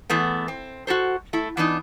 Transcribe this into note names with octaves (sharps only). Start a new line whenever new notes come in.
E2 A3 B3
C4
F#4 G4 A4 C5
A3 E4
E3 B3 D4 D#4